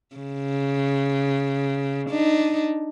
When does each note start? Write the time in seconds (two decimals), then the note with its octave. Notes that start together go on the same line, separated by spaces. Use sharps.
0.16 C#3
2.10 D4 D#4